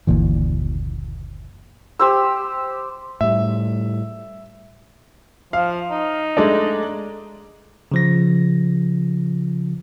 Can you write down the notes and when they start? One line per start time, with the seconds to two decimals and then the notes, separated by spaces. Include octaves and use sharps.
0.07 F#1 D2 A#2 E3
1.99 G4 C5 E6
3.21 A2 G3 E5
5.53 F3 F5
5.91 D#4
6.37 G#3 A3 D4
7.92 C#3 F3 A#6